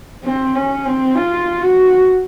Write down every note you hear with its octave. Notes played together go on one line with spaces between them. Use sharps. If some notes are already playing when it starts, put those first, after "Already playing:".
C4
C#4
C4
F4
F#4